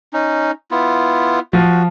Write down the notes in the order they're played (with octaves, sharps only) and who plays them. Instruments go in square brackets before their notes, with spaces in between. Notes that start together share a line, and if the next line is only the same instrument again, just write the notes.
[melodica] C#4 D#4
B3 E4 F4
[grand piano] F3 [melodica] F#4